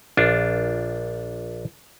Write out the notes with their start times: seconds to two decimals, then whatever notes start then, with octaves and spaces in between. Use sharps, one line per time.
0.17 A#1 D4 F4